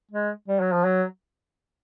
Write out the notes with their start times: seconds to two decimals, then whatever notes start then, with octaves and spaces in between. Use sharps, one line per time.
0.11 G#3
0.48 G3
0.60 F#3
0.72 F3
0.84 F#3